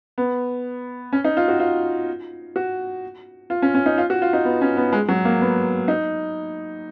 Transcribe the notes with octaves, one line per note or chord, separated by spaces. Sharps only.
B3
C#4
D#4
F4
F#4
F4
F#4
F4
C#4
C#4
D#4
F4
F#4
F4
D#4
B3
C#4
B3
G#3
F#3
A#3
B3
D#4